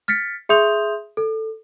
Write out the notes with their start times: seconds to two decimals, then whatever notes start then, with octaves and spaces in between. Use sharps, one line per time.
0.08 F6 A6 B6 C#7
0.49 G#4 E5 C6 D#6 G6 F7
1.17 A4